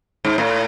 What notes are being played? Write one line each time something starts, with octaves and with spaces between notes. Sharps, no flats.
G#2
A2